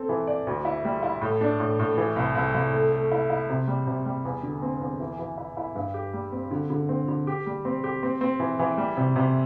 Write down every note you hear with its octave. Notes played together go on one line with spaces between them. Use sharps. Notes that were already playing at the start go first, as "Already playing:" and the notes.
Already playing: C4 A4
E3
D5
D2
E4
G3
E4
A2
D4
A2
A2
E3
C2
C2
C2
A3
A3
E4
E4
C3
G3
C3
G3
E2
D3
C4
E2
E3
E3
E4
E4
G2
G4
G3
C4
D3
D3
C4
D3
G4
G3
C4
G4
C4
C4
E3
E3
G3
C3
C3